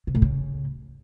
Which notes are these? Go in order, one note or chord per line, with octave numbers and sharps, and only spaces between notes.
C3
A2
C#3